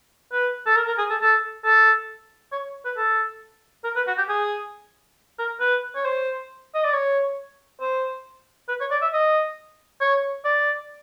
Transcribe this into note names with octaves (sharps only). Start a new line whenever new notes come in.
B4
A4
A#4
A#4
G#4
A4
A4
A4
C#5
B4
A4
A#4
B4
F#4
G4
G#4
A#4
B4
C#5
C5
D#5
D5
C#5
C5
B4
C#5
D5
E5
D#5
C#5
D5